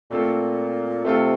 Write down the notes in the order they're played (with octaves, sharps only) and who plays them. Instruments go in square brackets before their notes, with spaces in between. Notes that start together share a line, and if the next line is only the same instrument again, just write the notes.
[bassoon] A#2 [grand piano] A3 C4 F4 A4
[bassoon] C3 [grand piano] A3 C4 F4 A4